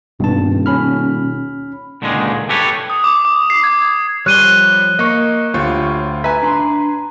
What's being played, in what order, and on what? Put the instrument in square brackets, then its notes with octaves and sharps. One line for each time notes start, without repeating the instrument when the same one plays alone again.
[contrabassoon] D#1 [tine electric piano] G2 A5 [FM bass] B2
[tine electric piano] C#4 B5 F6
[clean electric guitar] C#2 A#2 D3 D#3 G#3
G4 A4 B4 C#5
[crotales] D#6
D6
D6
C7
G#6
[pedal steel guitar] F3 C#5 F6 [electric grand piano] G3 [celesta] F#6 D#7 G7
[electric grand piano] A#3 [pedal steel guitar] D#5 C#6
[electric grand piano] D2 F4 [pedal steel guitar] G4 C5 C#5
[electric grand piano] B4 G#5 [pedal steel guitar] E5 [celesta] A#5
[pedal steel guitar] D4 B5 C6